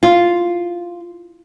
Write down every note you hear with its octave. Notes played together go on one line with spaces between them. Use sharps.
F4